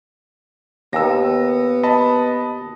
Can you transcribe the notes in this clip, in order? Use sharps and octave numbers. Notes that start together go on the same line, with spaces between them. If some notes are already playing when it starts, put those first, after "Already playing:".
D#2 B3 E6 A#6
D#5 A5 B5